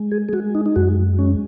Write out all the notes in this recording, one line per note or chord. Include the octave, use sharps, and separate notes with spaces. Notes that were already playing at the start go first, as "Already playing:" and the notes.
Already playing: G#3
G#4
G#4
G#3 F#4
D#4
D#4
F#2 F#4
G#3 C#4